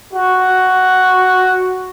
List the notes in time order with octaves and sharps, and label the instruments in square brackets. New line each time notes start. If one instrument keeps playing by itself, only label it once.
[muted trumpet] F#4